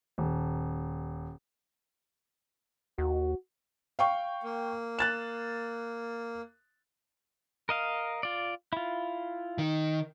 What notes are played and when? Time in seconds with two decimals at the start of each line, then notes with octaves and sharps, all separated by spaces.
0.18 D#1
2.98 D#2 F#4
3.99 F5 G5 C#6
4.44 A#3
4.99 F#6 A6 E7
7.69 A#4 D#5 F5
8.23 F4 D5
8.73 E4 F4
9.58 D#3